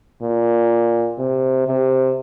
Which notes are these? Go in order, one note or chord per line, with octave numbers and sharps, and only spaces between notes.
A#2
C3
C3